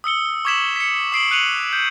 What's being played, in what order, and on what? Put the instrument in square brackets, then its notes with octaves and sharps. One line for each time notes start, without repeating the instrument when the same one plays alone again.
[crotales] D#6 E6 C#7 G7
C#6 D6 G#6 B6 E7 F#7
B6 C#7
D#6 C7 D7 F#7
F#6 C#7 D#7 F7 F#7
G6